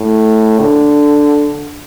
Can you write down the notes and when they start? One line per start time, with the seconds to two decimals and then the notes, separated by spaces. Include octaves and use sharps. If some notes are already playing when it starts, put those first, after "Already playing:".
Already playing: A2
0.60 D3